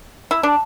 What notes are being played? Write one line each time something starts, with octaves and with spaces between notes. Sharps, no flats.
E4
D4